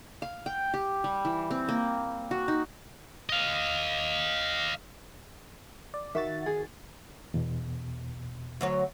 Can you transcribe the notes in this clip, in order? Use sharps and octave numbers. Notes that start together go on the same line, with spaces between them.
F5
G5
G4
G3
E3
C4
A#3
F#4
D#4
D#5 F5
D5
D#3 F#4 E5 A6
G#4
E2 B2
D2 F#3 C#5